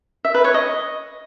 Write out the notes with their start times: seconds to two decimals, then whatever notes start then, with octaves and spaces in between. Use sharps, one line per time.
0.25 E5
0.34 B4
0.44 C#5
0.54 D#5